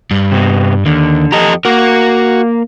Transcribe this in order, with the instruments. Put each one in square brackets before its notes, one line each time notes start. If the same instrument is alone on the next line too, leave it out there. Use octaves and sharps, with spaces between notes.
[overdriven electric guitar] G2
[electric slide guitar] C3 B3
[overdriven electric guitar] D#2 [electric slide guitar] D3
[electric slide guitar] F2 A4 A#5 [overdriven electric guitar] G4 D#5
[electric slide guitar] A#3 A#4 [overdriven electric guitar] F#4